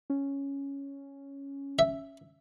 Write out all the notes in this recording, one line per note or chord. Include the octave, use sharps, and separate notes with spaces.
C#4
E5